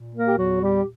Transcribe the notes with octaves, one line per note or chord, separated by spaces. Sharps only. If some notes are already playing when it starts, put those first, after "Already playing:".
Already playing: A#2
A#3 A#4
G4
E2 F#3 F#4
G3 G4